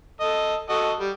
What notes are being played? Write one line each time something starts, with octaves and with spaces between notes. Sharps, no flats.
A4 D#5
F#4 A4 D#5
G3